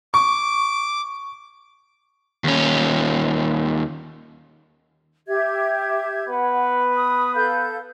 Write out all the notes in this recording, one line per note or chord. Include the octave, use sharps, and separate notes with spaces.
C#6 D6
D#2 C#4
G4 E5 G#6
B3 B4 F#5
D#6
A4 F5 G6